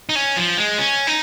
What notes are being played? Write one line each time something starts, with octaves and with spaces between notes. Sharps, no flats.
D#4
C#4
F3
G#3
C#4
D#4